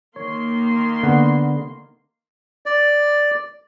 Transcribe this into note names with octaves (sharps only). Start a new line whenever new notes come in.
D#3 A#3 C#5 C6
D3 B3 F#5
D5